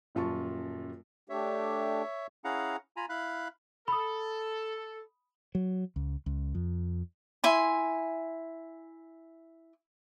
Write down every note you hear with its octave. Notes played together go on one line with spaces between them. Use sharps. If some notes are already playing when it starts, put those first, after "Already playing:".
D#1 F#2 F4 A5 C#6
A3 D4 G4 C#5 E5
C#4 E4 G#4 F5 F#5 A#5
F4 G#5 A#5 B5
E4 F5 B5 F#6
A4 B5 D#6
F#3
C#2
C#2
F2
E4 G#5 C6